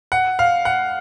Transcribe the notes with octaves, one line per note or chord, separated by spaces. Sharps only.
F#5
F5
F#5